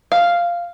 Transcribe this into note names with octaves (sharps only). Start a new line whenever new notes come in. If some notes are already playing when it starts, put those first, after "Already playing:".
F5